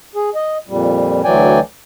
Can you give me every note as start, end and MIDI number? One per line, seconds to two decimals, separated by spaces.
0.15 0.30 68
0.35 0.57 75
0.68 1.22 41
0.68 1.22 46
0.68 1.22 55
1.24 1.60 38
1.24 1.60 52
1.24 1.60 54
1.24 1.60 74
1.24 1.60 79
1.24 1.60 80